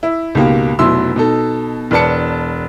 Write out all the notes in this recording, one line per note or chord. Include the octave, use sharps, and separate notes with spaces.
E4
C#2 G#2 B2 A#3 G4
F1 B2 F#3 E4 C6 E6
B2 D#4 A4
E1 B4 D5 A5 C#7